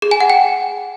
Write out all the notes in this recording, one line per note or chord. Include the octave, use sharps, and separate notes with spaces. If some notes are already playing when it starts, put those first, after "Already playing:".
G#4
G#5
F#5
G5